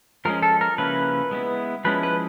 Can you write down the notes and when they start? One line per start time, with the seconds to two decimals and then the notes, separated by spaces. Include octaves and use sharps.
0.25 F3 G#3 C#4 A#4
0.43 A4
0.61 A#4
0.78 C#3 F3 A#3 C#4 E4 B4
1.31 G#3 B3 E4
1.85 F3 G#3 C#4 E4 B4
2.03 B4